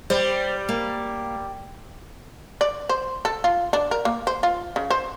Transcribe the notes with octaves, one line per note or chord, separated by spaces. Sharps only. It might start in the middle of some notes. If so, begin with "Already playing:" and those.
G3 C5 D5
A#3
D5
C5
A4
F4
D4
A#4
A#3
C5
F4
C#3
C5